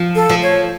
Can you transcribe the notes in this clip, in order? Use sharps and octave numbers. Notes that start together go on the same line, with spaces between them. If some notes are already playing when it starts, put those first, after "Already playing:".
Already playing: F3
A4
F3
C#5